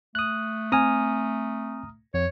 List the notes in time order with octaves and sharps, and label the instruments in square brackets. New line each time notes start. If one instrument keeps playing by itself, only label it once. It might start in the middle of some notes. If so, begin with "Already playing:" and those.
[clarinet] A3 [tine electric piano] D#6 F#6
[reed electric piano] C4 G#5 [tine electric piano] A#5 D#6 F6
[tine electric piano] F2 [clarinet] C#5